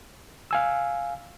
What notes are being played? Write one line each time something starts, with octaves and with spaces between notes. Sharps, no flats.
F5 G#5 E6